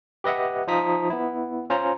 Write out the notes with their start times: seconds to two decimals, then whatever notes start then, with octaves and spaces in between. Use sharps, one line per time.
0.24 G4 B4 D#5 E5 F#5
0.68 F3 D#4 F4 A#5 D#6 B6
1.10 B3 E4
1.70 C#4 F4 C5 A#5